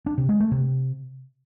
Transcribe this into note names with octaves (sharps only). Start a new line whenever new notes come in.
D4
C3
G#3
A3
C3